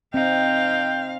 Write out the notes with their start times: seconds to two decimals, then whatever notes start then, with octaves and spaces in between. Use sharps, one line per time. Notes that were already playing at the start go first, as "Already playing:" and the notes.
0.14 C4 D#4 F5 G5